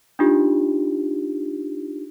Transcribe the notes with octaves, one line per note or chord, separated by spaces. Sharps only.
D4 D#4 F4 G4